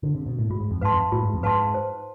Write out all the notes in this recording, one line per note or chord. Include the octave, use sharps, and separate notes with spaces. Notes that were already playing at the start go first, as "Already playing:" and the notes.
D3
C3
B2
A2
G#2 F4
G#2
F2
G#2 B4 F5 A5 C6
F2
A2 F4
G#2
F2
G#2 B4 F5 A5 C6
C5